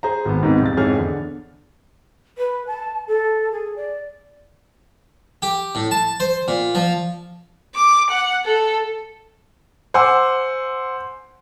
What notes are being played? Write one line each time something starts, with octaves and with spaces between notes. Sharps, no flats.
G#4 C5 A#5
G#1 B3
G#2 C3 D#3 B3 C4
C2 F2 A6
F2 G#2 E3 G#4 C#5 F6
E2 D3
B4
A5
A4
G#4
D5
G4
A2
A5
C5
A#2
F3
D6
F#5
A4
C5 F#5 G#5 C6 D6 E6